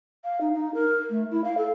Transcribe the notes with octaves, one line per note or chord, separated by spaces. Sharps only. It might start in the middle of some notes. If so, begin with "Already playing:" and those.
F5
D#4
D#4
A#4
A3
E4
F5
A4